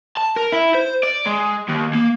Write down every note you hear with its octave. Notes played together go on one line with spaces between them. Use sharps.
A5
A#4
E4
C5
D5
G#3
D#2
A#3